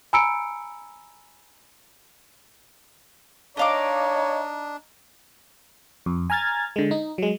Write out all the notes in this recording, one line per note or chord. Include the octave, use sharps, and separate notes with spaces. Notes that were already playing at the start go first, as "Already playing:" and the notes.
G#5 A#5 B5 E6 C#7 D7
D4 D#4 C#5 D#5 F5 D6
F2
G#5 A#5 F6 G#6 A6
D3 G#3
D#4
F#3 G#3